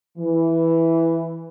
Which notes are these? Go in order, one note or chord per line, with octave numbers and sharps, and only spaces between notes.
E3